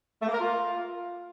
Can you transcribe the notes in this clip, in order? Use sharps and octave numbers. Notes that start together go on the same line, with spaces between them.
A3
A#3
A#4
F4